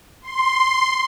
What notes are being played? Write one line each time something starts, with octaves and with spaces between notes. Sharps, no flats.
C6